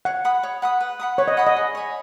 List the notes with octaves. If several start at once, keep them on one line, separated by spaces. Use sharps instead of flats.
C#5 F#5
F#5 B5 D#6
C#5
F#5 B5 D#6
B4
F#5 B5 D#6
B4 C#5
D#5
F#5 B5 D#6
D#5
G#4
C#5 G#5 B5